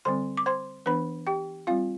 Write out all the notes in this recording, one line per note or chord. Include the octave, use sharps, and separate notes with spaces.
D3 G3 C4 C5 C6
D6
C5 C6
E3 B3 D4 B4 B5
G4 G5
G3 C4 F4 F5